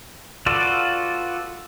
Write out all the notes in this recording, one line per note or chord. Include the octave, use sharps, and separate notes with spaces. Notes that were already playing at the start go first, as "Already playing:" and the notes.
F4 F#4 A4 B4 D5